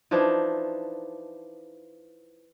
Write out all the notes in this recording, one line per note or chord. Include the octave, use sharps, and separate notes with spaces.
E3 F3 D4 D#4